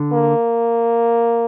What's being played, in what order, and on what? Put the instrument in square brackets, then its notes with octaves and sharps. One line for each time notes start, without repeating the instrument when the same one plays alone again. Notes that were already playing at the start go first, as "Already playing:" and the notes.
Already playing: [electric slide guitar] D3
[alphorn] A#3